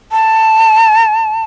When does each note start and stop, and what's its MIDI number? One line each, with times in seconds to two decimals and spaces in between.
0.12 1.44 81